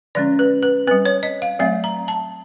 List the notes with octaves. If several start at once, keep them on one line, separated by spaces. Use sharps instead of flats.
D3 F3 G#3 C#4 D5
B4
B4
G3 C4 B4
C#5
D#5
F5
F#3 A3 C4 E5
A#5
A5